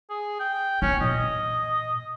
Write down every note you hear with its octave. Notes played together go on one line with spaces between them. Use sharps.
G#4
G5
B3 C#4 F4
A#2 E3 D#5